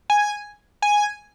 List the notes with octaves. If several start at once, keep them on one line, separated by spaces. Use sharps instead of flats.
G#5
G#5